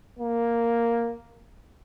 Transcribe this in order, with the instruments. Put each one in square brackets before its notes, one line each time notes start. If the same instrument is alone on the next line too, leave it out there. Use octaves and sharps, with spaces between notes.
[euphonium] A#3